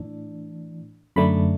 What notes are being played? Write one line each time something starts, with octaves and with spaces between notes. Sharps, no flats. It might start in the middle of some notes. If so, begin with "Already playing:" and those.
Already playing: A2 E3 D4
F#2 D3 A3 D4 B5